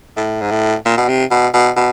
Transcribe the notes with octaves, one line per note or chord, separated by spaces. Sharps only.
A2
G#2
A2
A#2
B2
C3
B2
B2
B2